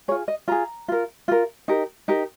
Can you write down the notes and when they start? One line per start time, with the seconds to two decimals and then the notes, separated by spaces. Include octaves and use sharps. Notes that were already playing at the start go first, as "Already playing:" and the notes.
0.08 G#4 C#5
0.11 F4
0.28 D#5
0.48 F4 G#4 A#5
0.88 F4 A#4
1.28 F4 A#4
1.68 D#4 G4 A#4
2.08 D#4 G4 A#4